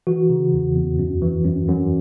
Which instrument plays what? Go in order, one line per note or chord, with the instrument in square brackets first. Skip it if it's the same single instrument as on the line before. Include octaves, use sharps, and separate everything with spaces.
[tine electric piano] E3 F#4
C#3
E2
E2
F#2
E3
F#2
F#2